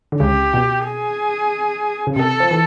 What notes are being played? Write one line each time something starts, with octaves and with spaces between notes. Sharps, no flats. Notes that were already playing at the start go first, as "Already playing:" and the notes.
D3
C#2 C#3 G4
B2
G#4
C#3
C3 A4
F3
E3